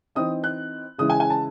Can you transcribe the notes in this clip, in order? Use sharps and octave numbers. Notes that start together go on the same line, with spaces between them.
E3 C4 D#4 D#6
F#6
C#3 E3 G#3 C#4 E4 D#6
G#5
G#5
A5